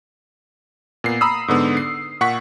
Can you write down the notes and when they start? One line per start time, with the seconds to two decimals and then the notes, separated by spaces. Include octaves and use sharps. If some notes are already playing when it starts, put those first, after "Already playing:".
1.04 A#2 B3 C7
1.21 A#5 B5 D#6 E6
1.48 G#2 D3 B3
1.77 C7
2.21 A#2 F#5 C#6 B6